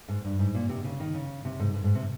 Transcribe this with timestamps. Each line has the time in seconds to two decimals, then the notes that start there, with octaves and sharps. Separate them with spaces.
0.09 G#2
0.25 G2
0.39 G#2
0.55 A#2
0.69 C3
0.84 C#3
1.00 D#3
1.14 C#3
1.45 C3
1.59 G#2
1.74 G#2
1.84 G#2
1.95 C3